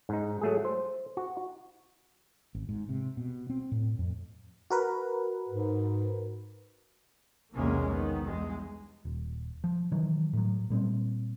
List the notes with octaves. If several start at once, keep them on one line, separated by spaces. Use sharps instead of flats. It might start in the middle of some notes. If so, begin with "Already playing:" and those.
G#2 D#4
F#3 A3 G#4
C5
F#4
G#1
G#2
C3
B2
C4
A2
F2
F#4 A#4 B4
G#2
B1 E2 C3 G#3 A#3 C#4
D#3 B3
E2 G2 G#3
D#1
F3
D#3 E3 F#3
A2 F#3
A#2 G3 B3 C4